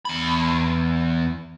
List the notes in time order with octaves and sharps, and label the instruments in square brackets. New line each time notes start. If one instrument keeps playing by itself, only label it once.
[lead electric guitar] E2 B5